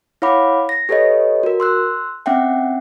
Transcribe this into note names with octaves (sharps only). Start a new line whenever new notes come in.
E4 C#5 F5 F#5 B5 D6
A#6
G4 A4 B4 C#5 D#5
F#4 A#4
C6 E6 F#6
C4 C#4 E5 F#5 G5